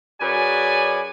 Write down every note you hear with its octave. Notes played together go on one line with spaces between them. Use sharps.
F#2 G#4 B4 C#5 D5 G#5